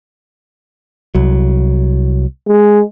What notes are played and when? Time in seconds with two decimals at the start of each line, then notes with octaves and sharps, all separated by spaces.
1.15 C2 F#3
2.48 G#3